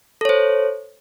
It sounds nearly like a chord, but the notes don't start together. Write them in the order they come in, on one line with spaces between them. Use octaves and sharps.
A4 C#5 C5